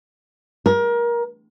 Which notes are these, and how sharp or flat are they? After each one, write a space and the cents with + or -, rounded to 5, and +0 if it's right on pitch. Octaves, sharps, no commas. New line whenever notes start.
A#4 +25